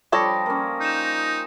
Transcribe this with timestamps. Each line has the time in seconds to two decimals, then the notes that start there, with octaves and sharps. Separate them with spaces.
0.12 F3 G3 D4 A4 C#5 D#6 A#6
0.46 A#3 C#4 C6
0.81 D#4 G6 E7